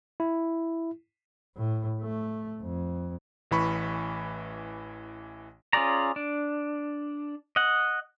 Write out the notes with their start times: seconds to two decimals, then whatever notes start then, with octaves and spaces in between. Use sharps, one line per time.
0.20 E4
1.56 A2
2.01 A3
2.62 F2
3.51 A1 E3 B5 C#6
5.73 C#4 F4 G#4 D5 A#5
6.16 D4
7.56 D#5 F#5